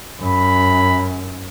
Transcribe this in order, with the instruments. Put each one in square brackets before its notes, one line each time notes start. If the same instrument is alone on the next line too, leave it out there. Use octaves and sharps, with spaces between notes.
[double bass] F#2 [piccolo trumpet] B5